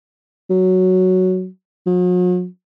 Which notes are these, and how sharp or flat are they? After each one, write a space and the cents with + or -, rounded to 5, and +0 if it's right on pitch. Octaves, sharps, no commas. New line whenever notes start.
F#3 +5
F#3 -45